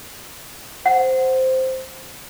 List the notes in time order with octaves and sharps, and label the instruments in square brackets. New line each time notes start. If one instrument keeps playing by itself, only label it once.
[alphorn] C5 [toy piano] F#5